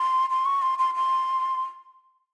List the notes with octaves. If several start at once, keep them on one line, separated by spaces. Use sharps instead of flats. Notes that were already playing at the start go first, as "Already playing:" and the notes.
Already playing: C6
C6
C#6
C6
C6
C6